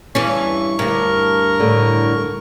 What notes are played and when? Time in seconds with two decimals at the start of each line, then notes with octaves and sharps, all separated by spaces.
0.15 G2 E3 C#4 C#6
0.79 D2 G2 A#4
1.60 A2 D3